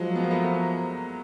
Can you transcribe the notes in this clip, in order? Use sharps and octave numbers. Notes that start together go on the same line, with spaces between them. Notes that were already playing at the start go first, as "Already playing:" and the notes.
Already playing: F3 F#3 G#3
B3
A#3
A3 B3